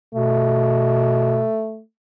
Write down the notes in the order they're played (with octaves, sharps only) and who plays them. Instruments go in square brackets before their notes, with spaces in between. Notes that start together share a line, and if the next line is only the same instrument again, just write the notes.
[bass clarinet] B2 [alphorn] A3